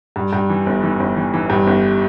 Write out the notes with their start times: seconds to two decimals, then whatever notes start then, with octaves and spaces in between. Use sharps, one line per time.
0.16 G2
0.33 G2
0.50 E3
0.66 G1
0.83 E3
1.00 G1
1.17 E3
1.34 E3
1.50 G2
1.67 G1